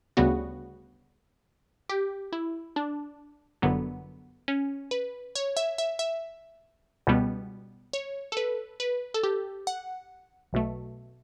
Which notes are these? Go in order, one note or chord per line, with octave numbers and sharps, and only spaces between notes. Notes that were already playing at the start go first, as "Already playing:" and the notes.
D2 C#3 G3 B3 F#4
G4
E4
D4
G1 F#2 D3 F#3 B3
C#4
B4
C#5
E5
E5
E5
C#2 B2 G3 B3
C#5
A4
B4
B4
A4
G4
F#5
B1 B2 A3